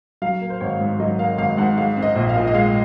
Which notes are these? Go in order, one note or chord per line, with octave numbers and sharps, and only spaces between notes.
F#3 F5
A#3
C5
G#1 C#5
G#2
F#3 D#5
A#3 F5
G#1 F5
G#2 F#5
G#3 F5
C4
D#5
A#1
F5
A#2
D#5
G#3 F5